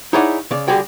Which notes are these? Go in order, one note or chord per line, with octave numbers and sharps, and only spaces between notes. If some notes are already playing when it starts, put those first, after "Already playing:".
D#4 E4 G#4 C#5 D5 F#5
C#3 D5
D3 G3 F#4 G#4 G5